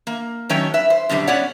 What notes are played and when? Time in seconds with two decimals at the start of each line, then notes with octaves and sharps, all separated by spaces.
0.07 A#3
0.49 D#3 F#3 A3 C#4 C#5 G5
0.74 B4 E5
0.90 C5
1.09 F#2 B2 D3 G3
1.27 B3 C#4 C#5 D5 F#5